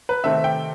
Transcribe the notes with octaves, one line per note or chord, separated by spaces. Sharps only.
B4
C3 D#3 A3 C4 E5
G5